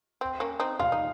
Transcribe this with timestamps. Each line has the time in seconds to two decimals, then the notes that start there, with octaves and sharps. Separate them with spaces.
0.21 C4
0.40 A#3 C#4
0.60 C4 D#4
0.79 F4 F5
0.92 D#4